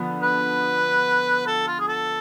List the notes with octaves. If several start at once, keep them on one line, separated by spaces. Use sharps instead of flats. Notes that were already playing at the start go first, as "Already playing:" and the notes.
Already playing: D3 F3 B3
B4
A4
F4
G#4
A4